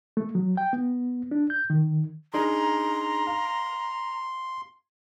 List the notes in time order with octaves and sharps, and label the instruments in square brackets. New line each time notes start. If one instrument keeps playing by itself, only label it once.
[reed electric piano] A3
F#3
G5
B3
D4
G6
D#3
[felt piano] D4 D#4 G#4 [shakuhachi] A#5 [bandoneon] C6
[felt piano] F5